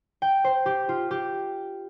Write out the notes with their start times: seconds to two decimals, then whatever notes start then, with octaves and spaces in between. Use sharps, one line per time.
0.22 G5
0.44 C5
0.66 G4
0.89 F4
1.11 G4